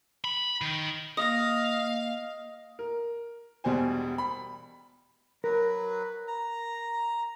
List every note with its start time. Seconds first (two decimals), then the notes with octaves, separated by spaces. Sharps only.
0.24 B5
0.61 D#3
1.17 A#3 D#5 F5 D#6 A#6
2.79 A#4
3.64 E1 B2 G3 C5 G#5
4.18 B5
5.44 F#3 A#4 B4
6.28 A#5